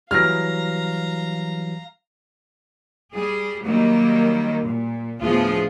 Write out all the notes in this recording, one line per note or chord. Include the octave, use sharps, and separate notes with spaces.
E3 F#3 G3 F5 A#5 F6 A#6
G3 G#4
D#3 F#3 G3 A#3
A#2
D2 A2 F3 B3 F4 G#4